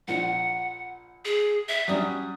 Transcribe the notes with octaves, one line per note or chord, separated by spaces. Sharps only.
A#1 A#2 F#5
G#4
E5
F#3 G3 C#4 D#6